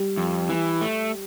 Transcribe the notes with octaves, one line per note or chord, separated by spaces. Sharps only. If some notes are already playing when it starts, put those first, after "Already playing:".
Already playing: G3
F2
E3
A3